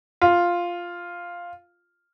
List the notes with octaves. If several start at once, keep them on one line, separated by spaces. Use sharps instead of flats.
F4